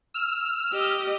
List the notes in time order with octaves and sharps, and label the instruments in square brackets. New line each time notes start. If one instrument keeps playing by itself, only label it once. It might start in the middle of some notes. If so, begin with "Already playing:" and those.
[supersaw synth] E6 F6
[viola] G4 D#5